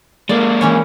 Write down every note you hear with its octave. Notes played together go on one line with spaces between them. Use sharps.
G#3 A#3 D5
E3 C#4 C#5